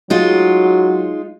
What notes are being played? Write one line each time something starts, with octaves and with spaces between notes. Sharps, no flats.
F#3 G#3 D#4 F4